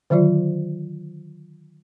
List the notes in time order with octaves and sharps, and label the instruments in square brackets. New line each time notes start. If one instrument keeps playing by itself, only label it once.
[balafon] D3 D#3 F#3 F4 D5